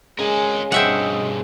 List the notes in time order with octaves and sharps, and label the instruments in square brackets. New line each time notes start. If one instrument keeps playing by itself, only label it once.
[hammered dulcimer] C#3 [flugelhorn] G#3 [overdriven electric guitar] A#4 G#5
[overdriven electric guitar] G2 B2 [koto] C4 E5 F#5 [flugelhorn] D#5